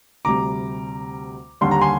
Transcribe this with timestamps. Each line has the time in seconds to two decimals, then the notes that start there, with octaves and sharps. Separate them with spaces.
0.25 D2 C3 G3 A#5 D6
1.61 D#2 D3 G3 C6
1.71 A#5
1.81 G#5 C6